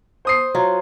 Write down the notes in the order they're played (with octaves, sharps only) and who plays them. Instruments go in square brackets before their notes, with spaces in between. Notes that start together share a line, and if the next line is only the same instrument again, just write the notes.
[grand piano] C5 D#6 C7
[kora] F#3 F4